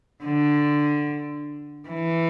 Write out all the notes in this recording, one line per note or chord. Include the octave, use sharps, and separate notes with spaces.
D3
E3